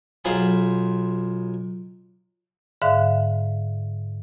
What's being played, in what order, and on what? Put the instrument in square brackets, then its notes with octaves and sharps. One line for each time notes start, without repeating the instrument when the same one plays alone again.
[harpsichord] B1 F4 G#4 C5 G#5 B5
[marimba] G#2 D3 E5 F5 F#6